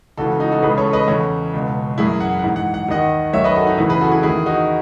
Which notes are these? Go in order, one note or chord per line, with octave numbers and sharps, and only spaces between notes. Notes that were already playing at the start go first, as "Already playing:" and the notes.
C#2 C#3 E3 F#4 A4
D#4 F#4
F#4 A4
C#2 C#3 E3 G#4 B4
A4 C#5
B4 D#5
E2 C#3 E3 A4 C#5
C#2 B2
F#2 E3 E4 G#4
F#5
F#5
G#2 E3
F#5
F#5
D#2 D#3 D#5 F#5
F#2 D#3 C#5 E5
B4 D#5
F#4 A4
D#4
E2 C#3 E3 E4
G#4 B4
F#4 A4
E4 G#4
E2 D#3 E4 G#4
D#4 F#4